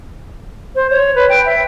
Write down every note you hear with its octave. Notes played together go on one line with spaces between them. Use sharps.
C5
C#5
B4
G5
E5